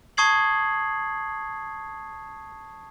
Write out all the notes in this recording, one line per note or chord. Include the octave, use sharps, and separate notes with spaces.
A5 C#6 D#6 G#6 C7 F#7